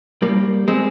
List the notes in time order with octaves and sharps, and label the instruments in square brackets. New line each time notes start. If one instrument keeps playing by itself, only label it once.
[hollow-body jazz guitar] G3 A#3
G#3 C4